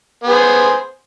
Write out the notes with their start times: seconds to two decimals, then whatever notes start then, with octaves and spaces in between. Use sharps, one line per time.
0.24 B3
0.28 G#4
0.32 C5